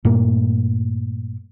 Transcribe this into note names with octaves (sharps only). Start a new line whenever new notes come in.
G2 A#2 A3 A#3